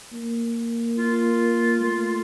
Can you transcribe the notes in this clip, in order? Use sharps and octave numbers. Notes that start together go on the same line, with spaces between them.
A#3
F4
A3